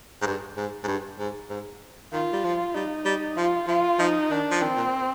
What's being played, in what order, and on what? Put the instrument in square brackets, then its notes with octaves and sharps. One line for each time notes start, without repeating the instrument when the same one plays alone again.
[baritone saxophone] G#2
G2
G#2
G#2
G2
G#2
G#2
[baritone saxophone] D#3 [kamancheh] F4
[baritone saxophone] G3
F3
[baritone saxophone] G3 [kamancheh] D#4
[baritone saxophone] G3
[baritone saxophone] F3 [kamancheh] F4
[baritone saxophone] F3 [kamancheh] F4
[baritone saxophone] F3 [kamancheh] D#4
[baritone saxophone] D#3 [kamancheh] D4
[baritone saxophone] F3
[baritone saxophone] D#3 [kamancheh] C4
[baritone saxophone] A#2